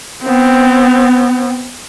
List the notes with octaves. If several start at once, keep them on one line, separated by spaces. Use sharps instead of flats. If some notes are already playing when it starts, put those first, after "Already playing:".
B3 C4